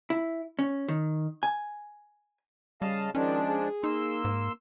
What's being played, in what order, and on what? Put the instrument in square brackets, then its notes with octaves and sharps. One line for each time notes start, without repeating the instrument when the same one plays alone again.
[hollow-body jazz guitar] E4
C#4
D#3
G#5
[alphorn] C#3 [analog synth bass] G3 [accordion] D#5 F5 A5
[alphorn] D#3 [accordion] F3 G#3 D4 [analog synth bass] C#4
[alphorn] G#4
[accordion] A#3 C6 E6 [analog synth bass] D#4
[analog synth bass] G#2